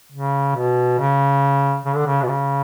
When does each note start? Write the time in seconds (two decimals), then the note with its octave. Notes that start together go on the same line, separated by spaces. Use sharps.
0.12 C#3
0.56 B2
0.99 C#3
1.85 C#3
1.96 D3
2.06 C#3
2.22 B2
2.28 C#3